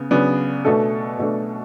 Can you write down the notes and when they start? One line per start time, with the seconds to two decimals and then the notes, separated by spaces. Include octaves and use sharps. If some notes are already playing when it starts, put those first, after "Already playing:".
Already playing: C#3 B3
0.11 C#3 F#3 B3 D4
0.65 B2 A3 D4 A4
1.19 B2 A3 D4 A4